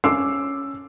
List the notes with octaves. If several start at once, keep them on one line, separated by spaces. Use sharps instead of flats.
C#4 D6 E6 C7